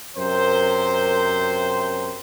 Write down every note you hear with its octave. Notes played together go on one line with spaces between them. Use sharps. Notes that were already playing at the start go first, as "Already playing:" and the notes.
F#2 C3 A#4 C5